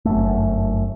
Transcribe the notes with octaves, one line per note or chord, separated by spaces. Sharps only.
G1 F#2 A3